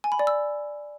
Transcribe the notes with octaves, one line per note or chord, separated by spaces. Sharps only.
G#5
B5
D5
E6